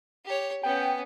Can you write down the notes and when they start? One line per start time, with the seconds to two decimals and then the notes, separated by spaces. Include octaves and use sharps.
0.25 G4 C#5
0.63 B3 C#4 G5